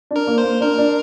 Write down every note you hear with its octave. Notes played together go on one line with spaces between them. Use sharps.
D4
A#4
A#3
C5
A#3
D4 A#4
D4